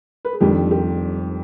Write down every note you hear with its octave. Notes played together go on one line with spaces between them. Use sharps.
B4
G#4
F1 F2 D#3 G3 D4 G4
G4